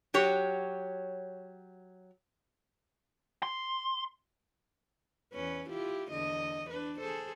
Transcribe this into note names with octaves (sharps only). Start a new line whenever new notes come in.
F#3 G4 C#5
C6
E2 C#4 B4
E4 F4 G4
E2 D3 D#5
D4 B4
G#4 A4 C5